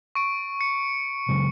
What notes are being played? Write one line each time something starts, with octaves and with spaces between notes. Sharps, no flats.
C#6 D7
C#7
C#3 F#3 G#3